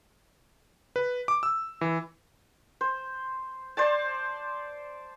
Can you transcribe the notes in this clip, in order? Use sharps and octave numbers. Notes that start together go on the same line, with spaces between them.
B4
D6
E6
E3
C5
C5 D5 A5